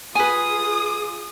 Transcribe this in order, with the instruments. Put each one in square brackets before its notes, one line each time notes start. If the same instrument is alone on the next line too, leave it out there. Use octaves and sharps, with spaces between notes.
[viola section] F4 G#4 [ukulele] B4 G#5 [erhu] D#6